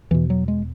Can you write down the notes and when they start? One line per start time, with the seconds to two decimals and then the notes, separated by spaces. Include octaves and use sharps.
0.11 E2 B2 E3
0.30 F#3
0.48 G#3